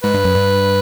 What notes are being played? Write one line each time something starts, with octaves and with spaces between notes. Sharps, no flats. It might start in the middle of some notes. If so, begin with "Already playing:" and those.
G#2 B4
G2
F#2
G2